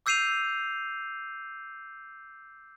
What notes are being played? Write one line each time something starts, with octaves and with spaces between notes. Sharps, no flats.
D6 E6 G6 C7 D#7 F7